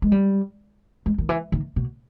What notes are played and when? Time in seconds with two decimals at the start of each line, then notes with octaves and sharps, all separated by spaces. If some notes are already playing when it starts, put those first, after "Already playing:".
0.02 G#3
0.12 G3
1.06 G#3
1.18 D#3
1.29 E3
1.52 D#3
1.76 B2